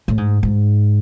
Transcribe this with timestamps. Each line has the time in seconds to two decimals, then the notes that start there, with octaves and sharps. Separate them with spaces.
0.08 A2
0.18 G#2
0.43 G#2